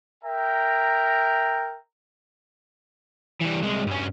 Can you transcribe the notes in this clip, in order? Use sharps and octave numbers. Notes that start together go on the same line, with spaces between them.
A#4 E5 G5 A#5
E3 G3
C2 G#3
G2 C#4